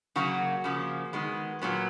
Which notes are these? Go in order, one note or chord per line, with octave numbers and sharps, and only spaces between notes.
C#3 F#3 A#3 F#4
C#3 F3 A#3
D#3 G#3 B3
A#2 F#3 B3